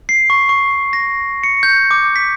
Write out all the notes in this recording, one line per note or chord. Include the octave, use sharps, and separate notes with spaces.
C7
C#6
C#6
A#6
C#7
G6
D6
B6